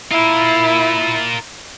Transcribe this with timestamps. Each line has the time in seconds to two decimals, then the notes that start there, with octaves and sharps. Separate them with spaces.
0.12 E4 F4 A#4